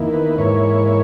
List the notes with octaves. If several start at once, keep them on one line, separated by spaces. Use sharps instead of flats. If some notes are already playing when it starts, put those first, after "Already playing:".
Already playing: E2 D#3 A#3 E4
B4
G#2 E3 A#3 E4 C#5
C#5